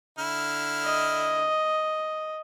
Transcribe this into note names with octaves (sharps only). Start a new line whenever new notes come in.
D3 E4 F6
D#5